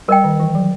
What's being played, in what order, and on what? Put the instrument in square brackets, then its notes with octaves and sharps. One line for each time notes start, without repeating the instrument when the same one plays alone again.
[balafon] G3 [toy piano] A#4 D#5 G5
[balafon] D#3
E3
F#3